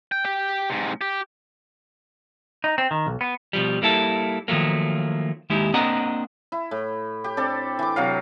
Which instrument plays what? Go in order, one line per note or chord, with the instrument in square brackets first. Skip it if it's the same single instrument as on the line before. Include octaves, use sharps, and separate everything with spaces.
[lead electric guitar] G5
G4 G5
G#2 C3
G4
[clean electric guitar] D#4
C4
D#3
B1
B3
B2 F3 G3
G3 A#3 E4 A4
D#3 F3 F#3 A3 A#3
D#2 G#3 D#4 E4 G4
A#3 C4 D4 D#5 F#5 A#5
[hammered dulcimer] E4
A2
G4
C4 D4 A4 D5
E3 D6
C3 F#3 F5